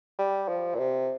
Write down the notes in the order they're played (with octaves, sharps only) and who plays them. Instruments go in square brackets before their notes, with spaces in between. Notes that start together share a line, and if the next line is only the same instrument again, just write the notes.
[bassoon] G3
F3
A#2
C3